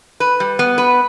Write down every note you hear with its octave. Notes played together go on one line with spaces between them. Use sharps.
B4
G3
B3
B4